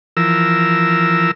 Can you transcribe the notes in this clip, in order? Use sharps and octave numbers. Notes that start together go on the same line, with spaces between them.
E3 F3 A#4 E6